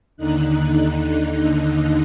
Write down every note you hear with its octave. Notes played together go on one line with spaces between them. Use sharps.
D#2 D3 D#4 F#6